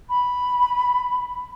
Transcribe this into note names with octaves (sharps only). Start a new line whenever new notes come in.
B5